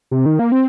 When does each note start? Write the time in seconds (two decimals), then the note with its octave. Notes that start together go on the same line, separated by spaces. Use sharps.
0.11 C3
0.26 D#3
0.39 A#3
0.52 C4